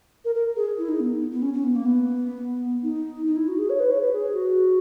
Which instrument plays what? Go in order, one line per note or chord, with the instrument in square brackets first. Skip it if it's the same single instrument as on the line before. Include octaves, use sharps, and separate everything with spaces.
[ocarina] A#4
A#4
G#4
E4
D#4
B3
B3
C#4
C#4
B3
A#3
B3
D#4
D#4
E4
F#4
G#4
C#5
B4
C#5
B4
G#4
F#4